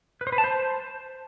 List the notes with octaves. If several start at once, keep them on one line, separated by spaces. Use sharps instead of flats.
B4
C5
B4
A5
C5